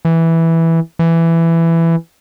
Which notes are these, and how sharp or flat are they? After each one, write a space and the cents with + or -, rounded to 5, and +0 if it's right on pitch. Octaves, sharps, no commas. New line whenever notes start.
E3 -5
E3 +10